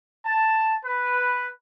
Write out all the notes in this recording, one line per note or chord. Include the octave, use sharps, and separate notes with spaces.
A5
B4